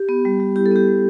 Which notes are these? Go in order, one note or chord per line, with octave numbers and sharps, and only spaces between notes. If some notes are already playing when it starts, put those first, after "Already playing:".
Already playing: G4
B3
G3
G3
E4 G4
A4
B3 G4
G3